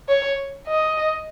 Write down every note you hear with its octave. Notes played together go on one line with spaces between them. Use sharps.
C#5
D#5